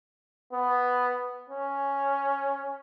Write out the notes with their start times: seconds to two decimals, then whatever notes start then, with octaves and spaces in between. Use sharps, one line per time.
0.53 B3
1.50 C#4